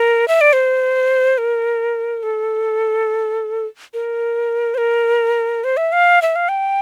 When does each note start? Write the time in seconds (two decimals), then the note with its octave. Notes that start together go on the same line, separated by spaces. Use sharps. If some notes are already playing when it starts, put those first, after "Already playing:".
Already playing: A#4
0.28 E5
0.41 D5
0.53 C5
1.38 A#4
2.23 A4
3.94 A#4
4.74 C5
4.78 A#4
5.64 C5
5.77 E5
5.92 F5
6.22 E5
6.36 F5
6.49 G5